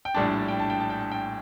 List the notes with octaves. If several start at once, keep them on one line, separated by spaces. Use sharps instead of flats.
G5
A#1 A2 G3 D4 A5
G5
A5
G5
A5
G5
A5
G5